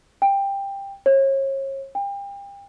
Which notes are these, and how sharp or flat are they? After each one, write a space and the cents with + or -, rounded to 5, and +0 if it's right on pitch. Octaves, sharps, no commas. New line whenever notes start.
G5 +15
C#5 -35
G5 +35